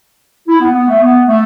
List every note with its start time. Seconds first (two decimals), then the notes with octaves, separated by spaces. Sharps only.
0.49 E4
0.61 B3
0.75 B3
0.88 A3
1.01 B3
1.28 A3